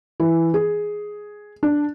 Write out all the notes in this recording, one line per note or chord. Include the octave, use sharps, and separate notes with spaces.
E3
G#4
D4